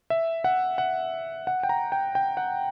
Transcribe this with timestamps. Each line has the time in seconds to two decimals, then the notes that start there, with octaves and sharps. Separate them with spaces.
0.10 E5
0.44 F#5
0.78 F#5
1.47 F#5
1.63 G5
1.69 A#5
1.92 G5
2.15 G5
2.37 F#5